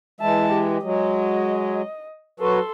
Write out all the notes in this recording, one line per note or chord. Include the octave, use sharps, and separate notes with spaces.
E3 G#3 E5 A5
G4
F#3 G#3 D#5
F#3 F#4 A4 B4 C6